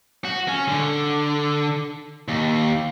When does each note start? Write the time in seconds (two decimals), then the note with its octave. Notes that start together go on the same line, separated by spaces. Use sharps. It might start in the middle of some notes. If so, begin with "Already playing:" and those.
0.25 F#4
0.48 C#4
0.68 D3
2.28 D#2